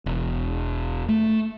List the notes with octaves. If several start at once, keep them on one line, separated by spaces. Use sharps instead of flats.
E1
A3